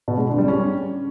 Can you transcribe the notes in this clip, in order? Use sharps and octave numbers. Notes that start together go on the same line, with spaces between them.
B2
G#3
D3
G3
C#4